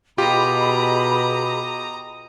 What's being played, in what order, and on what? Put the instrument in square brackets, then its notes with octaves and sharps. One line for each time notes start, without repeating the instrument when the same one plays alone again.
[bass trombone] B2 [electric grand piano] F4 G4 [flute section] G#4 B5 [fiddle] D#5 A#5